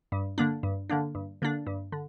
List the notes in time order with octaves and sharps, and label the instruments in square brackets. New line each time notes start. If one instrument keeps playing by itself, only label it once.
[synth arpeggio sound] G2
D3 A#3 D4
G2
D3 A#3 D4
G2
D3 A#3 D4
G2
D3